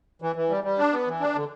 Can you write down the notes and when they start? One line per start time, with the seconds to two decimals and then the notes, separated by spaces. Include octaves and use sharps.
0.22 E3
0.36 E3
0.50 G3
0.64 G3
0.78 D4
0.92 B3
1.07 E3
1.20 D4
1.35 D3